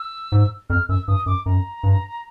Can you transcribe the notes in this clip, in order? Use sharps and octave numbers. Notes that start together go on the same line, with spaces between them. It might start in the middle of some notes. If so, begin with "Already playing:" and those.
Already playing: E6
G#2
F2 F6
F#2 E6
G2 D#6
F#2 D6
F#2 A#5
G2